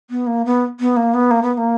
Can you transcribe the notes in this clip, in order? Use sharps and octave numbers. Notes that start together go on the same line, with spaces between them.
B3
A#3
B3
B3
A#3
B3
A#3
B3
B3
A#3